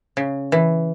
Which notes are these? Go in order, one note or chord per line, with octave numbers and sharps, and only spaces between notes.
C#3
E3